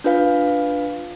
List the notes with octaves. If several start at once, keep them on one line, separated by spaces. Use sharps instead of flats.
D4 F4 B4 F5